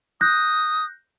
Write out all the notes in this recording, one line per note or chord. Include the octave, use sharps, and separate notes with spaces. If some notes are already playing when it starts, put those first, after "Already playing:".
D#6 F#6 G6 A#6